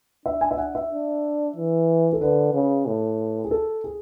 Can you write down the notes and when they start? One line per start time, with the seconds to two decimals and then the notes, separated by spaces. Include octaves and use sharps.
0.26 D4 E5
0.41 G#5
0.51 E5
0.58 F#5
0.75 E5
0.91 D4
1.56 E3
2.13 A4
2.21 D3 B4
2.54 C#3
2.86 A2
3.44 G#4
3.51 A4
3.84 G#4